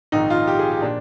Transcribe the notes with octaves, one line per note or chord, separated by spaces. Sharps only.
A#1 G#2 D#3 D#4
F4
G4
G#4
G4
A#2 F3 D4